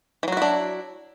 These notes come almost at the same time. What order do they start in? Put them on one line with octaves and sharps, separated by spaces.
E3 F#3 F#4 E4 D4